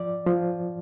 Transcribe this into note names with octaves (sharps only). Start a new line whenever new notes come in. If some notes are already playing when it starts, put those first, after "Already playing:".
Already playing: F3 D5
F3